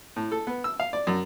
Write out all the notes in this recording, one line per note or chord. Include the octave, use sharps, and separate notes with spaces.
A2
A4
B3
E6
F5
D5
F#2